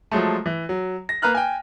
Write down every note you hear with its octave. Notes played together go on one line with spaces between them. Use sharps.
F3 F#3 G#3 A3
E3
F#3
A#6
A#3 B4 A#5 F6 F#6
G5 G#5